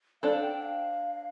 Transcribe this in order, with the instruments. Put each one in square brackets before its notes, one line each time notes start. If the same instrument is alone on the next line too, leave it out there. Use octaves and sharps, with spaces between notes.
[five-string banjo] D4 A4 C5 [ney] F5
[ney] G5
F5